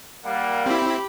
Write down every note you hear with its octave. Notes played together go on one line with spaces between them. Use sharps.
G3 A#3 F#5
C4 E4 G4 B5